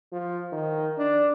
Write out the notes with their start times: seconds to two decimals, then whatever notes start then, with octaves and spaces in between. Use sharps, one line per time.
0.12 F3
0.53 D#3
0.98 D4